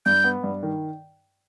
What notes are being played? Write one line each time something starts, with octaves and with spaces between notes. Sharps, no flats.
G2 G6
B3
G2
D#3